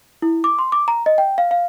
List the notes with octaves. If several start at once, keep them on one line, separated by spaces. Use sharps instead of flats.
E4
D6
C6
D6
A#5
D#5
G5
F5
F5